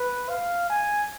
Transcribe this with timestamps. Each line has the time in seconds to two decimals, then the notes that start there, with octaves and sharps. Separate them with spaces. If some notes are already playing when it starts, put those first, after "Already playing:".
Already playing: B4
0.29 F5
0.70 G#5